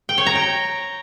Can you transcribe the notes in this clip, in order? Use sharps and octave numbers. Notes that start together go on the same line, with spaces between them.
G5
C#5
A#5
G5